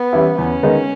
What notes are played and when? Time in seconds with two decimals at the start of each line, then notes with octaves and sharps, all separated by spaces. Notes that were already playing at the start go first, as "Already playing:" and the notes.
Already playing: B3
0.13 E3 G3 C#4 E4
0.38 E2 C#4
0.63 D#3 G#3 B3 D#4